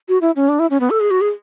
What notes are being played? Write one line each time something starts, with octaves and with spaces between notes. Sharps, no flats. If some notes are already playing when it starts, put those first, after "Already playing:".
F#4
E4
C#4
D4
E4
C#4
B3
A4
G#4
F#4
G#4